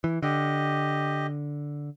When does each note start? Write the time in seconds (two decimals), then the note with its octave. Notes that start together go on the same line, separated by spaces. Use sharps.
0.04 E3
0.23 D3 G4 D#5